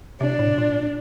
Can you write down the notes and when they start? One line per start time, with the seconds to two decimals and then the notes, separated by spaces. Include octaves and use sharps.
0.21 C3 D4
0.39 A2
0.58 A#2